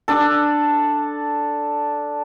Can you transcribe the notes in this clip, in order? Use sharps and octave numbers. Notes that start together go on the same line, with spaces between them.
D4 A4